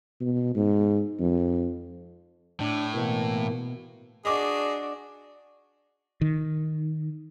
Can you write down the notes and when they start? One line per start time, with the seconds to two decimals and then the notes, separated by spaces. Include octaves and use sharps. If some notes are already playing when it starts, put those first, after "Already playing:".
0.21 B2
0.55 G#2
1.19 F2
2.60 A2 D4
2.94 B2 E3 A#3
4.25 D4 F#4 G#4 D#5 D6
6.21 D#3